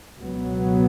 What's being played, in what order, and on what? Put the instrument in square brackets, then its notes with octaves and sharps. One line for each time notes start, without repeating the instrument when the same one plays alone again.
[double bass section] C#2 B2 F#3 B3